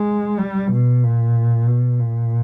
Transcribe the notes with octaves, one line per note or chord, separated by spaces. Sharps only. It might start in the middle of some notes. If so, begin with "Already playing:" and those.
Already playing: G#3
G3
B2
A#2
B2
A#2